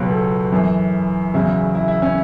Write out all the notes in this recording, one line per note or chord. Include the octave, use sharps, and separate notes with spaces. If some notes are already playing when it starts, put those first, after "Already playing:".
Already playing: C#2 B2 F#3 B4
A4
F#2 E3
E2 C#3 F#3 E4
E4
E4
C#4